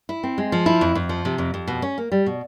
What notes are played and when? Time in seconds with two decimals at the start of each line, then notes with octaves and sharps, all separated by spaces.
0.09 E4
0.23 C4
0.38 G#3
0.52 F3
0.66 E4
0.81 F2
0.95 F2
1.09 F3
1.25 C3
1.38 F2
1.54 F2
1.68 B2
1.82 C#4
1.98 A#3
2.12 G3
2.26 B2